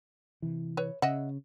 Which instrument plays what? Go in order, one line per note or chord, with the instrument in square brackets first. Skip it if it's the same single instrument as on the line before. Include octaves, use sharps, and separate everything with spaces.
[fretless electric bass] C3 E3
[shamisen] B4 C#5
[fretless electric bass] C#3 [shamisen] D#5 E5 F#5